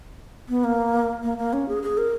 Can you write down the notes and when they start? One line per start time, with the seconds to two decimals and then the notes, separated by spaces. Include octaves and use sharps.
0.49 B3
0.64 A#3
1.23 A#3
1.38 A#3
1.53 C#4
1.69 G#4
1.83 G#4
1.98 A#4